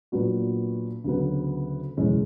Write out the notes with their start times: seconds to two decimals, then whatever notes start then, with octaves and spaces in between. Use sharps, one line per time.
0.12 A#2 F#3 B3 D4 F#4
1.04 D2 C#3 F#3 B3
1.97 F#1 E2 B2 G#3 C#4